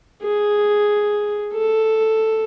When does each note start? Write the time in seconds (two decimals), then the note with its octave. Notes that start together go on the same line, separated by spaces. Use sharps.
0.23 G#4
1.53 A4